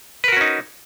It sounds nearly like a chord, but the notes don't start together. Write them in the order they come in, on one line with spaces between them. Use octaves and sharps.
B4 A#4 F#4 C#4 D#4